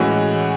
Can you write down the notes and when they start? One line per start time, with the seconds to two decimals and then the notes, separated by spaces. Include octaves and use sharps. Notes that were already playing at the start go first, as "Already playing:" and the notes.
Already playing: A2 E3 G#3 C#4 F#4